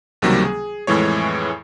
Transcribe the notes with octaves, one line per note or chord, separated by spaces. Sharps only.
C#2 C3 D#3 F#3 G3 A#3
G#4
F2 A2 E3 G#3 C#5